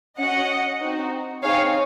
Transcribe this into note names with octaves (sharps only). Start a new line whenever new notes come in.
C#4 F#4 D#5 F#5
C4 D#4 F#4
C4 D#4 G#4 C#5 F5